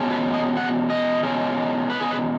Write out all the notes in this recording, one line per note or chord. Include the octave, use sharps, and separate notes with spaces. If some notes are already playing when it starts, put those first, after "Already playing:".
Already playing: B2 G#3 C#4
B4
D#5
F#5
D#5
B2 G#3 C#4
B4
G#4
B4